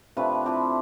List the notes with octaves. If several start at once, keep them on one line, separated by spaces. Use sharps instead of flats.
C3 F3 A3 D4 B4
F3 C4 E4 G4